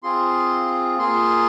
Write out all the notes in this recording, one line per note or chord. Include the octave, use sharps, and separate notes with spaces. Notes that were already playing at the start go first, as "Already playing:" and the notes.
C4 F4 G#4 C6
A#3 F4 G#4 C6